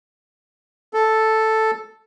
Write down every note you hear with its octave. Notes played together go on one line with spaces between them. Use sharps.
A4